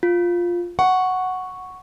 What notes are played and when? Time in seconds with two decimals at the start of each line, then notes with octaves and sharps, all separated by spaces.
0.03 F4
0.79 F#5 C#6